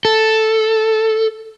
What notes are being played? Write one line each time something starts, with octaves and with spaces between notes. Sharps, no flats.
A4